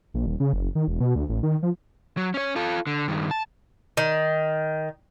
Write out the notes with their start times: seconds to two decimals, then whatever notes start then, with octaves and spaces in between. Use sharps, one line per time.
0.14 A#1
0.26 D#1
0.40 C#3
0.53 F#1
0.75 D#3
0.88 E1
1.00 B2
1.16 D2
1.29 A1
1.43 D#3
1.63 F3
2.17 F#3
2.34 C#4 C#5
2.56 F4 A4
2.87 D3
3.08 G2 D#3
3.31 A5
3.97 D#3